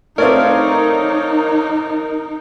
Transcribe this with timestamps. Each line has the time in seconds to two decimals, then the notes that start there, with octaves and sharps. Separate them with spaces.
0.18 A3 C4 D#4 A#4 C#5 D5 F5